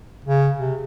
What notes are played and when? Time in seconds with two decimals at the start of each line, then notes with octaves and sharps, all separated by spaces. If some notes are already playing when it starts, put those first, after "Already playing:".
0.25 C#3
0.58 C3